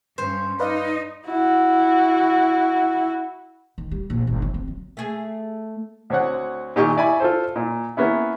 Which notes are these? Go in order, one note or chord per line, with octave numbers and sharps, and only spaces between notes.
G2 C#4 C5
D#4 B4 D5 D#5 F5
E4 F#4
D#3
G3
A#1
G1
F3
C4
F#3
A3 G#4
D2 C4 C#5 F#5
A#2 D#3 G4 D#5 G#5 C#6
E4 D5 G#5 B5 C#6
F4 A4 C5
A#2
A#3 B3 C#4 E4